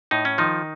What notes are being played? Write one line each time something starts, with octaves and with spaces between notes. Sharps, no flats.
A2 D#4
C#4
D#3 F3 D#4